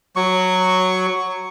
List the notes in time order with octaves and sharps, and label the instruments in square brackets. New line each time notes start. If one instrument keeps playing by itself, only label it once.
[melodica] F#3 C#6